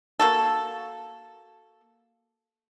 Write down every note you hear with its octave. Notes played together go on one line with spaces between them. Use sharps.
A#3 F#4 A4